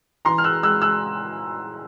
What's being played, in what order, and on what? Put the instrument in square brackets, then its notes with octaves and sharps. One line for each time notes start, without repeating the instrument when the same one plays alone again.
[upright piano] E3 A#5 C6
F6
E6 F#6
G#3 E6 F#6
E6 F#6